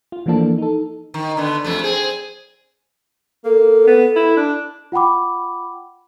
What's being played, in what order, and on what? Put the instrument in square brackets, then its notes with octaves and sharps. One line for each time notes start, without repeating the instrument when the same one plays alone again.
[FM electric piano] F4
E3 F3 A#3 D4 A4
D#4 A4
[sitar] D#3
D3 B3
F2 C3 A3
C4 G#4
[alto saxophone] A#3 [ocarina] A4
[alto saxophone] B3
E4
D4
[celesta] F4 F#5 G5 B5 D6